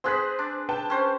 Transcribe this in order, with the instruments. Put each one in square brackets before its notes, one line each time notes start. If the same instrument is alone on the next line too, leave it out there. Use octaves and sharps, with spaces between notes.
[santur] C4 G#4 B4 [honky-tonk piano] C5 F#6 B6
[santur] D4
[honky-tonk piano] B4 G5 A5
[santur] C#4 C5